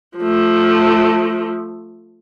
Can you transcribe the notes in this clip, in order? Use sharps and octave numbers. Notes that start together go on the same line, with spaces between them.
F3 A3